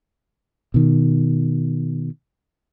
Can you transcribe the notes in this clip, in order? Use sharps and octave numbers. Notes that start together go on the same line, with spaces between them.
B2 D#3